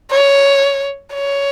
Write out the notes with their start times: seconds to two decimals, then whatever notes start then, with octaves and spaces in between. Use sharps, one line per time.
0.11 C#5
1.14 C#5